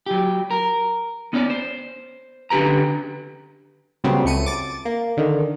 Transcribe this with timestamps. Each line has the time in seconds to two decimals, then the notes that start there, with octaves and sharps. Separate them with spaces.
0.06 F#3 G4
0.51 A#4
1.33 B3 C#4 C#5 D5
1.50 C5
2.50 D3 C#4 G4 B4 A#5
4.04 A#2 C#3 F#3 G3 B3 C4
4.25 C#2 A3 C#7 D#7
4.46 D6 A6
4.85 A#3
5.17 D3 D#3